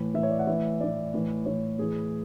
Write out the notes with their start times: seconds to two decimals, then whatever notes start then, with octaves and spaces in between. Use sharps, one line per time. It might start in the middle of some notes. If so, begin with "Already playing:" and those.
Already playing: A2 E3
0.14 E3 E5
0.18 A2 C#5
0.31 D5
0.39 F#5
0.47 A2 E3 E5
0.80 A2 E3 D5
1.14 A2 E3
1.46 A2 E3 C#5
1.78 A2 E3 G#4